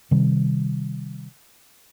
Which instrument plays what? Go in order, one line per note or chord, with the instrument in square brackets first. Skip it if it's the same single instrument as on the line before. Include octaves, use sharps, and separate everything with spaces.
[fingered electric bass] C3 D#3 G3